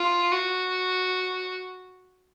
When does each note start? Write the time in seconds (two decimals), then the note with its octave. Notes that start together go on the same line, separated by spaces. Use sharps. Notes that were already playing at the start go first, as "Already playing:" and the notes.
Already playing: F4
0.32 F#4